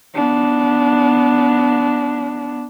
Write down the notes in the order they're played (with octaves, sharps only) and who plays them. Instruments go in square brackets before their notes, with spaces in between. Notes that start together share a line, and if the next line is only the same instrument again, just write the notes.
[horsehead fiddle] B3 D4